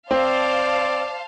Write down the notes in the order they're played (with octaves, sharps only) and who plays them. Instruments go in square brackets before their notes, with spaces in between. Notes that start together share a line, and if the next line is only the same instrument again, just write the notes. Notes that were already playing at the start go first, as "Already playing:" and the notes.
[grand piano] C4 [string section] C5 F5 A5 [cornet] D5